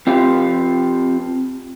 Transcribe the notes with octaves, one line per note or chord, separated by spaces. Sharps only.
C4 F4 G4 F5